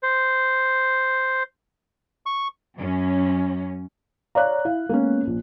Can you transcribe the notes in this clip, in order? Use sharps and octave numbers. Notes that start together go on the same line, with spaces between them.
C5
C#6
F#2 C#4
C#5 D5 F5 A#5 F#6
E4 F5
G#3 A#3 B3 C#4
A#1